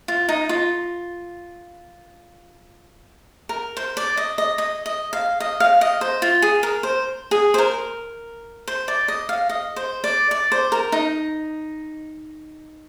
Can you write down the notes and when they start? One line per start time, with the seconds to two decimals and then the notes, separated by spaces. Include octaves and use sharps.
0.08 F4
0.29 D#4
0.49 F4
3.49 A#4
3.77 C5
3.97 D5
4.17 D#5
4.38 D#5
4.58 D#5
4.86 D#5
5.13 F5
5.40 D#5
5.60 F5
5.81 D#5
6.01 C5
6.22 F4
6.42 G#4
6.63 A#4
6.83 C5
7.31 G#4
7.54 C5
7.58 A#4
8.68 C5
8.88 D5
9.08 D#5
9.29 F5
9.50 D#5
9.76 C5
10.04 D5
10.31 D5
10.52 C5
10.72 A#4
10.92 D#4